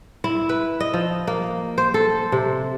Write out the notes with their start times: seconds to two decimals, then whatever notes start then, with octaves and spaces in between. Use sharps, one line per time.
0.24 E4
0.49 B4
0.80 D#5
0.94 F3
1.27 A#3
1.78 C5
1.94 A4
2.32 C3